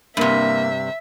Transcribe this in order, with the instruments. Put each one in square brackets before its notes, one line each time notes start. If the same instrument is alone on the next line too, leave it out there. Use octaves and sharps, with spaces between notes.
[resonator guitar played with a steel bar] G2 C3 [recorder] A#3 [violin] E5